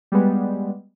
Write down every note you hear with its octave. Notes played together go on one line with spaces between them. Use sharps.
G3 G#3 B3